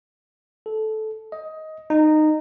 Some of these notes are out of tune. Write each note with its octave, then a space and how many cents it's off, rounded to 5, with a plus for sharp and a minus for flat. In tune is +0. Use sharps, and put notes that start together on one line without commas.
A4 -15
D#5 +15
D#4 -15